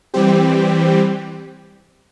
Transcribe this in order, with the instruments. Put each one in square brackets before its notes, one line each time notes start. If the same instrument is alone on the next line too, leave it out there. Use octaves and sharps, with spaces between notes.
[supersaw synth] E3 G3 C4 G4